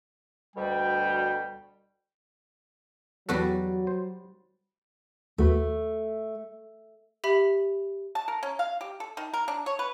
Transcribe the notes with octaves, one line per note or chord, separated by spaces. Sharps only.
D2 B2 G3 G5
E2 F#3 G3 B3 F#4 A4
C5
D#2 A3 F#4 B4
G4 E5 B5 B6 F#7
A5
A#4
C#4
F5
G4
A4
D#3
A#4
D4
C#5
B4